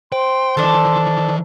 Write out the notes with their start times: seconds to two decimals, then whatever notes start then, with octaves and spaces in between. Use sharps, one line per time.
0.12 C5 G5 C6
0.57 D#3 E3 D4 A4